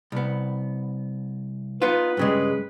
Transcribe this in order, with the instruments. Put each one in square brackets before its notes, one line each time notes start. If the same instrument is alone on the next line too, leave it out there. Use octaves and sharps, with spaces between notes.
[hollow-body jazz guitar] C2 B3
[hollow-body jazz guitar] B3 D#4 F4 [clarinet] B4
[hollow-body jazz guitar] G2 C#3 G#3